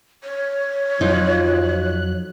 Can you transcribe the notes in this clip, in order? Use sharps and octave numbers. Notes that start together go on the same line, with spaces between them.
C#5
F2 F3 F#3 D#4 F4 F#6